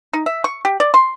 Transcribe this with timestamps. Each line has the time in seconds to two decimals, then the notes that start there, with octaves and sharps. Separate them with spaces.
0.13 D#4
0.26 E5
0.44 C#6
0.65 G4
0.80 D5
0.94 C6